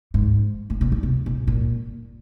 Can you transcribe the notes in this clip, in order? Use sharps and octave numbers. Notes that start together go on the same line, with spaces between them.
G#2
A2
A#2
D3
C3
B2
A#2